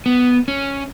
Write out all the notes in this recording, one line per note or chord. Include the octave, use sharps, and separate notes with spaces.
B3
C#4